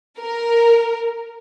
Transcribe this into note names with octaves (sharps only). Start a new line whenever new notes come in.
A#4